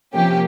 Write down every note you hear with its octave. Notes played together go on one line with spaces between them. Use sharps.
C3 F3 A#3 C#4 G4